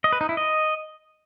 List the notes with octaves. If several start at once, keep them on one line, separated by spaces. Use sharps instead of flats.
D#5
B4
D#4
E4
D#5